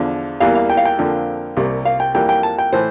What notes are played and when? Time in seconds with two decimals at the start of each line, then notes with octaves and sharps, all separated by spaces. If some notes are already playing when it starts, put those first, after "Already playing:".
Already playing: E2 D3 F3
0.40 E2 E3 G3 A#3 F5
0.55 F5
0.70 G5
0.77 F5
0.85 G5
0.98 F2 D3 F3 A#3
1.57 C2 C3 G3 A#3
1.85 F5
2.00 G5
2.15 F2 E3 G3 A#3 G5
2.29 G5
2.43 A5
2.58 G5
2.72 A2 E3 A3 C5